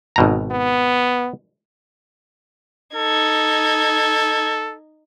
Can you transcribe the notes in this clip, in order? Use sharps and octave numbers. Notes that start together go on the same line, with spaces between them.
G#1 B2 A#5
B3
D#4 A4 G#6